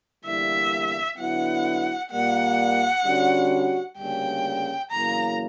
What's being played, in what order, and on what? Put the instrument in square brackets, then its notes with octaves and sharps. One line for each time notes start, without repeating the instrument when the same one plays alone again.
[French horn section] E2 D3 G3 A#3 E4 [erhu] E5
[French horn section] D3 F#3 B3 E4 [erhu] F#5
[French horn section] A#2 G3 A#3 [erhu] F#5
[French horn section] D3 G3 C#4 F#4
[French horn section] D2 C#3 G3 A#3 C#4 [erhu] G5
[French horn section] E2 C#3 F#3 A#3 E4 [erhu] A#5